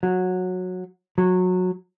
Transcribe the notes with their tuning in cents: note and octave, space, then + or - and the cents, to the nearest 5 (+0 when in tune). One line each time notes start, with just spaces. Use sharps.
F#3 -15
F#3 -20